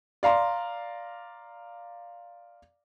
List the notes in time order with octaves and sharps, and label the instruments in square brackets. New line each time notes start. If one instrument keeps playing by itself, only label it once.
[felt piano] D5 F5 A#5 C6